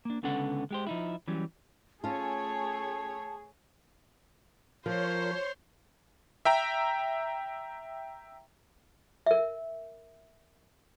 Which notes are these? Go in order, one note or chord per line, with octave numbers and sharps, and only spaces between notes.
A#3 D4
C#2 D3 B3 C#4 A4 F#5
G#3 G4 C5
F3 D#4 E4
E3 F#3 G3 C#4
A3 C#4 F4 G#4 C#5 A5
F3 F4 A#4 C5 C#5 C6
E5 G5 A#5
A#4 E5